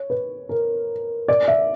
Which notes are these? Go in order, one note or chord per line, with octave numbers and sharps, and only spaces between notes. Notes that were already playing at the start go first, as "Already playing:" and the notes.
Already playing: C#5
B4
A#4
D5
E5